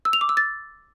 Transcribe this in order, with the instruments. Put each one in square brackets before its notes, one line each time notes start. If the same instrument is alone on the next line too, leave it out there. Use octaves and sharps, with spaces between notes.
[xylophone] E6
F7
D6
E6
A6